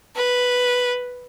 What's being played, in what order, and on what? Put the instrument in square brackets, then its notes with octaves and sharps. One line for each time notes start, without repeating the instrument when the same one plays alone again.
[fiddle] B4